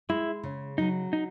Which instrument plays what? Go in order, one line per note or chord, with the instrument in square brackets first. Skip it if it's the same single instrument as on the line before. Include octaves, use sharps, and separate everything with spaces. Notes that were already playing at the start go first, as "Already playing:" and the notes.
[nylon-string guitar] G#3 [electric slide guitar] E4
[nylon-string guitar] C#3
[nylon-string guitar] F#3 [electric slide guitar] D#4
[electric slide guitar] D#4